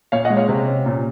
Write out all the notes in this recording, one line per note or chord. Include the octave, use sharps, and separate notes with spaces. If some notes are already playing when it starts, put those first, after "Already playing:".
A#2 C#5 F5
D#5 F#5
G#3
C#5 F5
C3
C#4
A#2